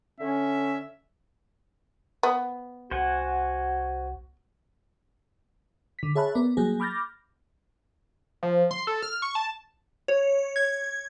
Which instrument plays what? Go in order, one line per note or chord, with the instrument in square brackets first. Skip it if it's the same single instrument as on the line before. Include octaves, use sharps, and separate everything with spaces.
[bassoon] D3 [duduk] C#4 [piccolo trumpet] E5
[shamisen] B3
[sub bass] C2 [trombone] F#4 [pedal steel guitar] C5 F#5 G#5
[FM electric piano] D3 B6
G#4 C#5 E5 A5 B5 F#6
B3 A#4 D5
F#3 G3 A#3 G#4
B5 D6 F6 G6 A6 A#6
[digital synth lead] F3
C6
A4
F6
C#6
A5
[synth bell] C#5
G#6